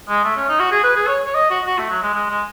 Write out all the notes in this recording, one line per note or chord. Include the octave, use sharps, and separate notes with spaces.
G#3
A3
C#4
D#4
F#4
G#4
B4
G#4
C#5
C#5
D#5
F#4
F#4
A3
F#3
G#3
G#3
G#3